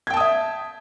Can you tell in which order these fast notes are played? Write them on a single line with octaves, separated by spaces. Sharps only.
G#6 G5 A5 D#6 E5